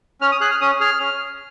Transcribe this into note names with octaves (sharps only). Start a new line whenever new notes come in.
C#4 F6
D#6
G#4 F#6
F6
C#4 D#6
G#4 F6
C#4